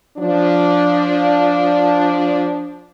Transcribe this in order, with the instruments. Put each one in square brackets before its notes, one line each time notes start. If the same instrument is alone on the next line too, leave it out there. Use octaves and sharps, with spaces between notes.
[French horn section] F3 D4